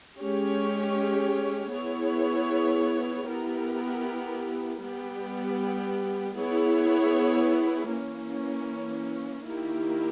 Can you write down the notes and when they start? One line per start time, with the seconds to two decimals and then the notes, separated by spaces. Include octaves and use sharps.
0.18 G#3 C#4 G4 C#5
1.72 B3 E4 G#4 C#5
3.27 B3 E4 G4 A#4
4.81 G3 B3 G4
6.36 B3 E4 G#4 C#5
7.90 E3 A#3 C#4
9.45 D#3 A#3 E4 G4